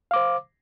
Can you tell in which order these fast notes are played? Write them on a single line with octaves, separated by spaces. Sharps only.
F5 D6 C5